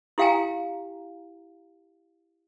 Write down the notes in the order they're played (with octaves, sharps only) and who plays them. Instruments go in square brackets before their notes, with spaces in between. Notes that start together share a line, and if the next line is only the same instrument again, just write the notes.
[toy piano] E4 G4 F5 G5 G#5 A#5